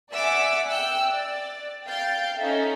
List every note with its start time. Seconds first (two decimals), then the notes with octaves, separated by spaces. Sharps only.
0.12 D5 E5 F#5 G#5 D6 E6
0.67 G5 E6 F#6
1.08 D5
1.87 F5 G5 G6 A6
2.38 C#4 D#4 A4 E5